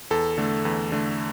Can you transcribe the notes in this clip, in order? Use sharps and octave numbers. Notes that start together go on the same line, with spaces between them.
E2 A4
D3 A3
E2
D3 A3